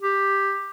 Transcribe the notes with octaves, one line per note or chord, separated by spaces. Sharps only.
G4